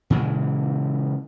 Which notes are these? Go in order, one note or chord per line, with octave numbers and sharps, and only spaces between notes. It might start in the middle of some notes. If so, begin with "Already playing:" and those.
A#2 C#3 E3 G#3